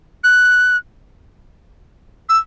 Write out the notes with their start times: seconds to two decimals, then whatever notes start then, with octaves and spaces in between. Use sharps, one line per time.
0.24 F#6
2.29 E6